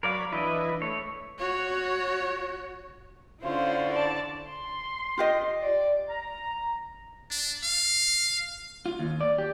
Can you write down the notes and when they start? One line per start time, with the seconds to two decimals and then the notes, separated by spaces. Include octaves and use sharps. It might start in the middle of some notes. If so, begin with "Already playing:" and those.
0.03 F#3 A#4 C#5 D5 F5 B5
0.32 E3 D4 E4 B4 D#5
0.82 A3 C#5
1.39 F#4 C#5
3.43 D3 C#4 E4 F4 C5
3.91 D5 A5
4.49 C6
5.18 F4 G4 D#5
5.62 D5
6.10 A#5
7.31 D4
7.64 F5
8.86 F4
8.99 D#2
9.21 D5
9.38 G4